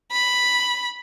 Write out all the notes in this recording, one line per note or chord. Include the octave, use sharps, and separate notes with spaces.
B5